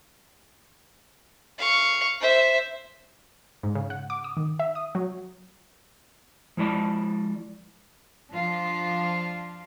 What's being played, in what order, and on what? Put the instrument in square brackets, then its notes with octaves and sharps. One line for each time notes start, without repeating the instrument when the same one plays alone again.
[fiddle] F5 C#6
C5 E5
[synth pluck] G#2
C#3
F#5
D6
D#6
D#3
E5
D#6
F#3
[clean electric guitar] F3 G#3 E4 D5 A5
[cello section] F3 D4 F4